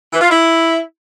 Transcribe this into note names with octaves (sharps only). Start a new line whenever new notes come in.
E3
F4
E4